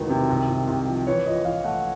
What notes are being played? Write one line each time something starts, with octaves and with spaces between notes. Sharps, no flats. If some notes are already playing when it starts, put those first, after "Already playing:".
Already playing: E1 D2 D#3 E3
C3
C2
C2
C2
F3
E3 C#5
A#1 D#5
E3 F5
A3 F#5